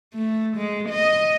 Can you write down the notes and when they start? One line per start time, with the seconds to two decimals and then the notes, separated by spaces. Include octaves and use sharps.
0.14 A3
0.56 G#3
0.89 D#5